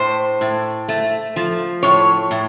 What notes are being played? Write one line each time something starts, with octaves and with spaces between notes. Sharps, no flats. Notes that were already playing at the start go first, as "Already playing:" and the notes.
Already playing: A2 C5
A2
A3
F3
A2 C#5
A2